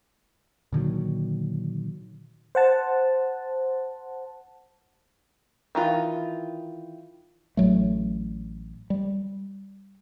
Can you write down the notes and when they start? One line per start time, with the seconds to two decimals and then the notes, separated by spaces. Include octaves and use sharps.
0.72 A#2 D3 D#3 F#3
2.55 C5 F#5 A5
5.75 D#3 E3 F4
7.57 A1 F#3 A3
8.90 G3